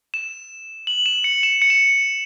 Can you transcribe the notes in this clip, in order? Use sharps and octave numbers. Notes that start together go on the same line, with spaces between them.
E7
F#7
E7
C#7
E7
C#7
E7